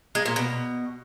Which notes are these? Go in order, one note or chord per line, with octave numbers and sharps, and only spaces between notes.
G#3
A#2
B2